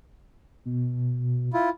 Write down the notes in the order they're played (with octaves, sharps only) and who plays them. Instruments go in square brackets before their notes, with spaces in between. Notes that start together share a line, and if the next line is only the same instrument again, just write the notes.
[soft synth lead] B2
[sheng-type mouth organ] E4 F4